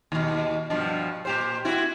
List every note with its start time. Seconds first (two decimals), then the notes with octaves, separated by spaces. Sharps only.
0.12 D#2 B2
0.70 G2 B2 F3
1.25 A#2 G4 C5
1.65 C4 E4 F#4